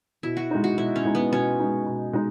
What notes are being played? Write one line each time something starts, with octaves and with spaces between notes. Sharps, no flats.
B2 E4
F#4
G#3 D#4
F#4
B2 E4
C#4
G#3 D#4
B3
B2 C#4
G#3 D#4
B2
G#3 D#4